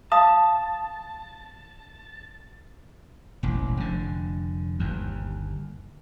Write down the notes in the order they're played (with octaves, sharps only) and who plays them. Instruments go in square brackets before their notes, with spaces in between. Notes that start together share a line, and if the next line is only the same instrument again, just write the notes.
[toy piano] F5 D#6 [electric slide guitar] A5
[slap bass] E1 A1
F1 D3
G1 D#2